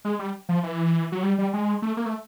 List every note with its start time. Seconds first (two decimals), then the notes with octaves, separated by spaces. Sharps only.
0.05 G#3
0.19 G3
0.49 F3
0.63 E3
1.12 F#3
1.23 G3
1.38 G3
1.54 G#3
1.82 A3
1.97 A#3
2.06 A3